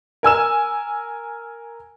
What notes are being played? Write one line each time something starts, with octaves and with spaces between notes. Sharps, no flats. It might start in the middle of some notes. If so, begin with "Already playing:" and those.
A#4 G#5 E6 E7